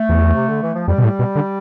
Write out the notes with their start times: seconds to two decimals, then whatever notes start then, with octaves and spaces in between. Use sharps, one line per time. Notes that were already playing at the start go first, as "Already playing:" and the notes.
Already playing: A3
0.09 E2
0.34 C3
0.48 D3
0.62 E3
0.75 F3
0.88 F2 G3
0.98 B2
1.04 A2
1.19 B2
1.35 D3